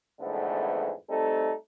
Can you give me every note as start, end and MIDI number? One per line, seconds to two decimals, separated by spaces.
0.20 0.92 41
0.20 0.92 44
0.20 0.92 50
0.20 0.92 52
0.20 0.92 57
0.20 0.92 59
1.09 1.52 55
1.09 1.52 57
1.09 1.52 60
1.09 1.52 63
1.09 1.52 69